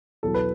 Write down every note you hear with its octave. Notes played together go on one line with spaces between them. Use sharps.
E2 B2 F#3 A4
B4